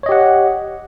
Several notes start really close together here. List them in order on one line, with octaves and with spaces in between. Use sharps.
C#5 D#5 G4 F#5